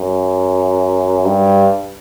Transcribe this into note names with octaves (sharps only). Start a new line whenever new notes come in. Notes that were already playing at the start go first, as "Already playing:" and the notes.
Already playing: F#2
G2